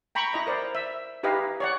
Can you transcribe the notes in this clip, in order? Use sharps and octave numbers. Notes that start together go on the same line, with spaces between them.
G5 A#5 B5 C#6
E4 D#5 A#5
A#4 C5 D5
E5
D#4 E4 G4 B4 D#5 F5
C#5 D5 F#5